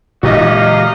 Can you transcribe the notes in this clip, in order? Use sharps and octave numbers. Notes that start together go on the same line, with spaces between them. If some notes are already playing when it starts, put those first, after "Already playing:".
A#2 E3 G#3 D#4 F#4 G4 D#5 F5